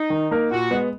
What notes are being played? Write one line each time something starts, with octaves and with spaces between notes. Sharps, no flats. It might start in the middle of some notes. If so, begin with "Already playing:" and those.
Already playing: D#4
D#3
A#3 D#4 A#4
A#2 F#4
G#3 B3